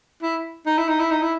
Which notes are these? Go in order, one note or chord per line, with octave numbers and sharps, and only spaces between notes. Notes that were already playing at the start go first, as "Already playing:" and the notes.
E4
D#4
E4
D#4
E4
D#4
E4